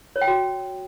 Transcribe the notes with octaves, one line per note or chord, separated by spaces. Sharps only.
C#5
G5
F#4